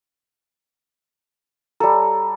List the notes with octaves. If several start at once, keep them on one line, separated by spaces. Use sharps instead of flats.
G3 A4 A#5